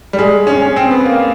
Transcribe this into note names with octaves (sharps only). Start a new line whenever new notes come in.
G3
G#3
C#4
C#4
C4
B3
A#3